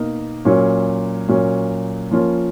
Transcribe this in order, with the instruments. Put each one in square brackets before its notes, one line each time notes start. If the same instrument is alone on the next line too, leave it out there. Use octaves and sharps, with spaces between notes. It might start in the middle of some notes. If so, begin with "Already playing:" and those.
Already playing: [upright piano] B2 A#3 D#4
A#2 F#3 C#4
A#2 F#3 C#4
F3 A#3 C#4 F4